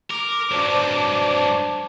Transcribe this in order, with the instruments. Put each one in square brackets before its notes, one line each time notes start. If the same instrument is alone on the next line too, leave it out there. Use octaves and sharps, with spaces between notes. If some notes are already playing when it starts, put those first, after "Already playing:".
[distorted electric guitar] A#4 [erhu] D6
[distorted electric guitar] G2 F#3 [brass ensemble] D4 C5 A5